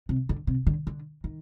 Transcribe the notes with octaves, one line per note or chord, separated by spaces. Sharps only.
C3
D3
C3
D3
D3
D#3